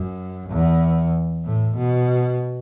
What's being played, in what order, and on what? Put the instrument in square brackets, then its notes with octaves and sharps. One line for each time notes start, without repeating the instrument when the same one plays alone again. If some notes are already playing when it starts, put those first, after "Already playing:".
Already playing: [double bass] F#2
E2
A2
B2